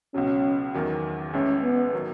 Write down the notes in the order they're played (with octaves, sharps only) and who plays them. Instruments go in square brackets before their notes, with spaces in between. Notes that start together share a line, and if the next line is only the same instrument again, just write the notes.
[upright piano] C#2 B2 F#3 [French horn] C#4
[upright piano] E2 D#3 F#3
[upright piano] A1 A2 G#3 [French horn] C#4
[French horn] B3
[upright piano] D#3 F#3